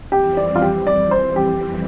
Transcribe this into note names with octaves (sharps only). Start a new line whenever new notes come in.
F2 E3 G3 C4 G4
D5
F4
G4
D5
C5
G4